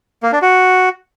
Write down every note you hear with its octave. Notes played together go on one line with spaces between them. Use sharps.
A#3
D4
F#4